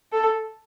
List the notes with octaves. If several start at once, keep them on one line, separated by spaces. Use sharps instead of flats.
A4